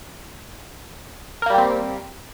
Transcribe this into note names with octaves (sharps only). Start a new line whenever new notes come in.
G3 A#3 C4 G4 A#4